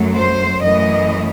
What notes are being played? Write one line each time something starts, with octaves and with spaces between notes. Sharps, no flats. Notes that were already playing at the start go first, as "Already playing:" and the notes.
Already playing: F#2 F#3 A3
C5
F#2 E3 A3 D#5